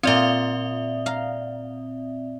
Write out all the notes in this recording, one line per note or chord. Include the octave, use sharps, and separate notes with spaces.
A#2 C4 F4 D5 E5
F5 A#5